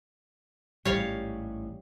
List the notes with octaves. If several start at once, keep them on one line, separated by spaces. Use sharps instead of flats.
A1 G#2 G3 C#5 F5